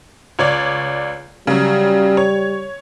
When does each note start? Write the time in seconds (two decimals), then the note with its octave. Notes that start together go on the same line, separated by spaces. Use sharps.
0.39 C#2 C#5 D5
1.47 C#3 F#3 G3
2.17 C#5